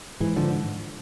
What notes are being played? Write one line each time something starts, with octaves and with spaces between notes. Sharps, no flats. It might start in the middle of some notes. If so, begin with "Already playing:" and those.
G#2 E3
D3 F3